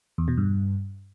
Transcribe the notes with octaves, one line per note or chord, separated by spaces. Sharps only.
E2
B2
G2